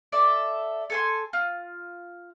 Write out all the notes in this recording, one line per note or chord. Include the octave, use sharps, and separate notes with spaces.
A4 D5 E5
A4 G#5 C6
F4